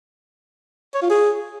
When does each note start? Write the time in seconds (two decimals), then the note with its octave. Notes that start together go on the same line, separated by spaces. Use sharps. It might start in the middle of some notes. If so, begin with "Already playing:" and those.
0.94 C#5
1.02 F4
1.10 G#4